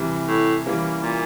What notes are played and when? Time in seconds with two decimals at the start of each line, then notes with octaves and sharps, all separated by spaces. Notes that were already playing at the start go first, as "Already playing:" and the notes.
Already playing: C3 E3 G3
0.28 A2
0.66 E3 G3 A#3 C#4
1.03 A#2